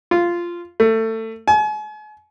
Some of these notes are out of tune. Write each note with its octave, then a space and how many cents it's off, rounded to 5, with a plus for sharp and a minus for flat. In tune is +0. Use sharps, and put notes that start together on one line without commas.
F4 -10
A3 +25
G#5 +40